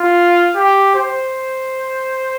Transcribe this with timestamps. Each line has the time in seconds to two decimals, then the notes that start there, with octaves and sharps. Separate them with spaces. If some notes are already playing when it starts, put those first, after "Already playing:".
Already playing: F4
0.56 G4
0.95 C5